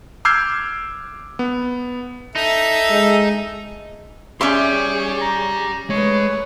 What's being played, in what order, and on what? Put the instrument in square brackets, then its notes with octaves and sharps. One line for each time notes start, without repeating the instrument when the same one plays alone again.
[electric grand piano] D6 E6 F6 G6 G#6 C7
B3
[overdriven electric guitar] D#4 [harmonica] A4 E5
[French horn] G#3
[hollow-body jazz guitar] C#4 E5 C6 [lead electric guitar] G4 D5 [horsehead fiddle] G#4 C#5 [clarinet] D6
[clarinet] A#5
[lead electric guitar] G#3 [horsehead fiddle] A3 B4 [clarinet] C#5